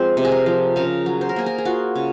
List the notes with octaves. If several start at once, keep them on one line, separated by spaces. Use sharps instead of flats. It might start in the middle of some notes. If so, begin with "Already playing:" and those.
Already playing: F3 G#3 C4 C5
C3
G#4
A#4
F3
C#3 A#4
F#3
C5
A#4
A#3 G#4
A#4
G#4
F4 F#4
C#3